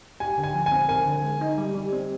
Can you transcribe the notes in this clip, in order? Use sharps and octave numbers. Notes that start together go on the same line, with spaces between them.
G4 G#5
D3
G#5
F3
G#5
C4
A#4 G#5
D3
G#3
D#4
G3
G3
C4